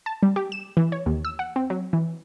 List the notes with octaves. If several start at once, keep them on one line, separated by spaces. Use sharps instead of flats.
A5
G3
G4
E7
E3
C#5
D#2
E6
F#5
C4
F#3
E3